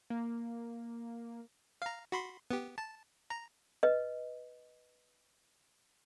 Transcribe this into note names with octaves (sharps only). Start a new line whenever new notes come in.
A#3
F5 A#5
F#4 B5 C6
B3 G4
A5
A#5
B4 D#5